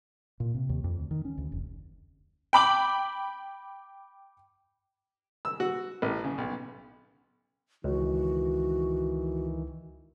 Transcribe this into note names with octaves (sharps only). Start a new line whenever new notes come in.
A#2
C3
D#2
F2
D2
D#3
C#4
D2
F1
G5 B5 D6 F#7
E6
F#4
A1
C#3
B1
C#2 D#3 E3 F#4